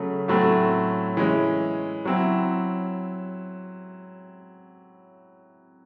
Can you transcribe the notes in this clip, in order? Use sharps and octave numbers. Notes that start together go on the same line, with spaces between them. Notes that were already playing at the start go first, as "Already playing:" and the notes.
Already playing: C#3 F#3 A3
A2 F#3 A3 C4
E3 G#3 C#4
F#3 C4 E4